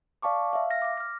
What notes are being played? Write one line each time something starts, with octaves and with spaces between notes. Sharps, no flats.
D5 F5 A5 C#6 D6
E5 F5
F6 A#6
D6 A#6
F6 A#6